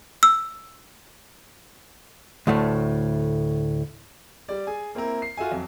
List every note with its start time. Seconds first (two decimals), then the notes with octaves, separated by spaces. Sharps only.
0.23 E6
2.47 D2 A2 A3
4.49 G3 D5
4.67 G#4 G#5
4.95 A#3 C4 E4 A#4
5.22 C7
5.37 F4 F#4 A4 E5 G#5
5.52 F2 F#3